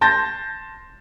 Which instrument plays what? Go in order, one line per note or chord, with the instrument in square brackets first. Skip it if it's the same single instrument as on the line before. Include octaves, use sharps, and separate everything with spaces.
[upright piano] A5 C6 G6 A6 A#6